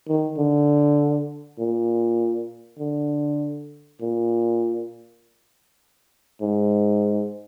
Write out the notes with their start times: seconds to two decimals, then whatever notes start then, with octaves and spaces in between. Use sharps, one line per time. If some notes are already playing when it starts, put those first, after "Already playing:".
0.08 D#3
0.38 D3
1.59 A#2
2.79 D3
4.01 A#2
6.42 G#2